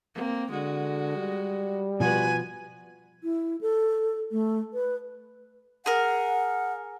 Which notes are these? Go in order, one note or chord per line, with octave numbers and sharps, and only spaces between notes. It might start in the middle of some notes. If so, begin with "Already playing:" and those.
A#3 C4
D3 G#3 F#4
G3
B2 F3 F#4 B4 G#5
E4
A4
A3
B4
G#4 A#4 F#5